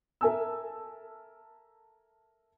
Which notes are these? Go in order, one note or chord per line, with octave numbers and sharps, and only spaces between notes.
A4 A#4 E5 G#5 A5 E6